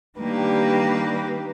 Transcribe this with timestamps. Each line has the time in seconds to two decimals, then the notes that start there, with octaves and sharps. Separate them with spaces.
0.18 D#3 G3 A#3 D4 G4 B4